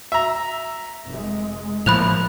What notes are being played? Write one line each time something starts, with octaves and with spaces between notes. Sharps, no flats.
E5 A#5
F1 G#3
A2 F3 A#3 B5 F#6 F7